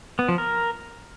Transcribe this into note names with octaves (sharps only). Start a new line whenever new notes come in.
B3
F3
A#4